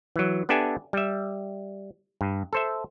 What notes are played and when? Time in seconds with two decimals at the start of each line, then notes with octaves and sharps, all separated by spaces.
0.16 E3 F#3
0.49 B3 D4 G4 A4 E5 G#5
0.93 G3 E5
2.21 G2
2.53 A4 C5 E5